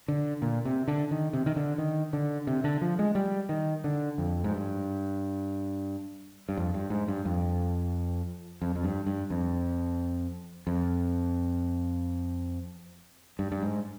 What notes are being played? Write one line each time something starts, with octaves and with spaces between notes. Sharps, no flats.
D3
A#2
C3
D3
D#3
C3
D#3
D3
D#3
D3
C3
D3
F3
G#3
G3
D#3
D3
F2
G#2
G2
G2
F2
G2
G#2
G2
F2
F2
F2
G2
G2
F2
F2
G2
G2
G#2